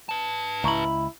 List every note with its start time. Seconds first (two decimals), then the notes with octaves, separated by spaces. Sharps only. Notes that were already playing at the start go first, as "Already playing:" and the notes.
0.09 B4 A5
0.64 C#2 E4 A#5 B5 C#6